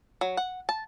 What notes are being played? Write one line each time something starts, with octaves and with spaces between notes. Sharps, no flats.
F#3
F#5
A5